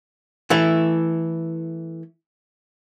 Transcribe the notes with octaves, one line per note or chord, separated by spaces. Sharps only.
E3 A3 E4